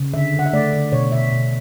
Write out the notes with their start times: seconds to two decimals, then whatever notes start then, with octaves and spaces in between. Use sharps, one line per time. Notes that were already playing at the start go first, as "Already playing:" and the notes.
Already playing: C#3
0.14 D3 E5
0.34 D3
0.39 F#5
0.46 E5
0.53 A3 D5
0.73 D3
0.92 B2 C#5
1.12 B2 E5
1.32 B2